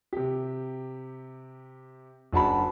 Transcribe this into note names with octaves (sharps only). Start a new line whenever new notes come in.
C3 G4
F#1 D4 F#4 A5 B5